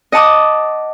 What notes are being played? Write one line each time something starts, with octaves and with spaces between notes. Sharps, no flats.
D#5 F#5 A5 D6 D#6